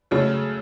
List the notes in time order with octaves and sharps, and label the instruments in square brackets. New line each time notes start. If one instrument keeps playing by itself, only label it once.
[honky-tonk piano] C#3 F#3 A3